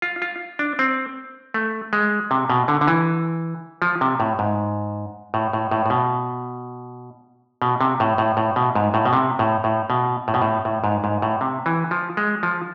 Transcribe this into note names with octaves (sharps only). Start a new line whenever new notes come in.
F4
F4
D4
C4
A3
G#3
C3
B2
D3
D3
E3
F3
C3
A2
G#2
A2
A2
A2
A2
B2
B2
C3
A2
A2
A2
B2
G#2
A2
B2
C3
A2
A2
B2
A2
B2
A2
A2
G#2
G#2
A2
C3
E3
F3
G#3
F3